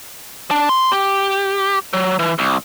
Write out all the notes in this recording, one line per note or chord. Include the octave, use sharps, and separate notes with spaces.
D4
C6
G4
F#3
E3
C2